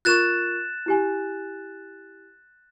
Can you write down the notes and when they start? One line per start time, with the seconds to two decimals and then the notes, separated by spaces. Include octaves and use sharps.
0.05 F4 A#4 C#6 F#6 A6 E7
0.86 E4 G4 G#5